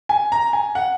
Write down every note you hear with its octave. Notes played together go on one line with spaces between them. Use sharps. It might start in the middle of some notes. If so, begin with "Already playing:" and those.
G#5
A#5
G#5
F#5